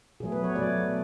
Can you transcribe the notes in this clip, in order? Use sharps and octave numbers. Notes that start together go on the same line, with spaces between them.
B2 F#3 A3 G#4
B4
C#5
B2 F#3 A3 D5